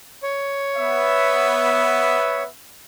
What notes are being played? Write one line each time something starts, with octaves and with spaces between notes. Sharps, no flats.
C#5
B3 E5